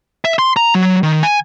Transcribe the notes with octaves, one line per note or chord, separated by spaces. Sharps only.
E5
C6
A#5
F#3
D#3
G#5